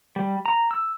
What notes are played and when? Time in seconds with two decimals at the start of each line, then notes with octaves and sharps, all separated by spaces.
0.16 G3
0.46 A#5
0.71 E6